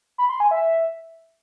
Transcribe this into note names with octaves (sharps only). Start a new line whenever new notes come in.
B5
C6
G#5
E5